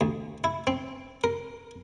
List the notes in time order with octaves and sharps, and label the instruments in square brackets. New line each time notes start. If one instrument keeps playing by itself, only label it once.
[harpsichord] D2
E4
C4
A#4